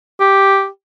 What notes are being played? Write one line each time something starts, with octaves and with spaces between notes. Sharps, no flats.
G4